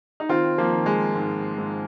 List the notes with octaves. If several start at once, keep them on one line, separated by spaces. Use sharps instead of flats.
D#4
D#3 C4 F4
F3 A#3
D#3
G#3
G#2
G#2